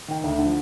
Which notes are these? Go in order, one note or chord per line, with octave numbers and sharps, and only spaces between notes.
D#3 G5
D2
D3
F3